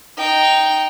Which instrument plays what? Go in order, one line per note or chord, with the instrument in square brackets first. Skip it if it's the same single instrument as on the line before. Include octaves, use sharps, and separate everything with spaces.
[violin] D#4 G5